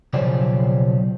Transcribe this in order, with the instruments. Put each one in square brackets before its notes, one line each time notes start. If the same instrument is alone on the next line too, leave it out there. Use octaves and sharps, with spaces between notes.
[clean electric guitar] B1 C#3 F3 C#4 G4 D5